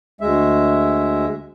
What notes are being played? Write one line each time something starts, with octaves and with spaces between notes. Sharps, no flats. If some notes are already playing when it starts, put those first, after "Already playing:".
D2 G#3 E5